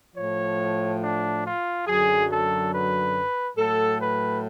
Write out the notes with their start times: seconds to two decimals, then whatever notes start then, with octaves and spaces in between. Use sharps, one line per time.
0.16 A2 F3 C#5
1.02 D4
1.45 F4
1.87 F#2 D3 F#3 G#4
2.29 A4
2.72 B4
3.57 A2 F#3 A4
4.00 B4